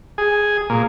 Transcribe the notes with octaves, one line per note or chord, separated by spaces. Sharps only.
G#4
A#2